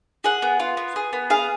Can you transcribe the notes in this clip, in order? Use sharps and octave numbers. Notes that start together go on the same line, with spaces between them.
G#4 F#5
B3
F4
B3
G#4
B3
G#4 F5